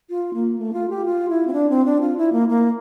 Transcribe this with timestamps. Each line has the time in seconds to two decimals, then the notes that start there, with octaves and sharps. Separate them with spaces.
0.10 F4
0.34 A#3
0.58 A3
0.73 F4
0.90 G4
1.05 F4
1.29 E4
1.47 C4
1.53 D4
1.70 C4
1.85 D4
2.01 F4
2.17 E4
2.33 A#3
2.49 A#3